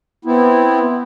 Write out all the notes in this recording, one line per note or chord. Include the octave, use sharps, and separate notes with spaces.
B3 C4 E4